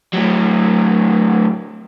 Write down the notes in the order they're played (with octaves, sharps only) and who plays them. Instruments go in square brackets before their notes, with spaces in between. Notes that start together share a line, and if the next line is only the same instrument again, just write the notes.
[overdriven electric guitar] A2 F#3